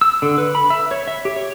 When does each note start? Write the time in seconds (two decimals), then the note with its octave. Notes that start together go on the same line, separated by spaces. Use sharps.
0.01 E6
0.22 D3
0.38 B4
0.55 B5
0.70 E5
0.91 C#5
1.08 E5
1.25 G4
1.36 C#5